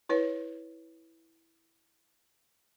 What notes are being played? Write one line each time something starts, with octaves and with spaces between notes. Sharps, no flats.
E4 B4 C#5